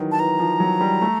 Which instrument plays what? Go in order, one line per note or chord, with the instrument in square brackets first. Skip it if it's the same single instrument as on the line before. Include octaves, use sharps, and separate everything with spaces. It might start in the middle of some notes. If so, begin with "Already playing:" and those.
Already playing: [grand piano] D#3 E3 F#3
[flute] A5
[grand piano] E3 [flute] A#5
[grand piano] F3
F#3
G3
A3